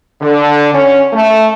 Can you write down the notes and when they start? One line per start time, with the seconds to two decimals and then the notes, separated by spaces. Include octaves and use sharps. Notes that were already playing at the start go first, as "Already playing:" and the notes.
0.22 D3
0.74 C#4
1.13 A3